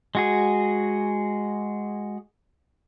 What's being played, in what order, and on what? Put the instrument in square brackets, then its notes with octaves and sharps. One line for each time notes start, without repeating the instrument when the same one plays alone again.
[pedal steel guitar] G#3 F#4 G#4